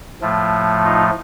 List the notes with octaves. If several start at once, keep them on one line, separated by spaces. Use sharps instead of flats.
A2 F3 A3
D#4 F4